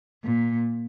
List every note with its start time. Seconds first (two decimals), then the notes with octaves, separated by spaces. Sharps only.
0.24 A#2